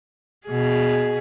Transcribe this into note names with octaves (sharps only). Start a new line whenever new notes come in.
B2 G#4